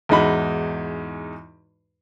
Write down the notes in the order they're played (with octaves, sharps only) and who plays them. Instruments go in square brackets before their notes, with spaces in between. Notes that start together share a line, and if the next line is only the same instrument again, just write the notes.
[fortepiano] E2 G#2 G#3 D#4 F#4 B5